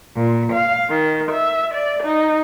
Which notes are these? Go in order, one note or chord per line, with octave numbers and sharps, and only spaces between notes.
A#2
F5
D#3
E5
D5
D#4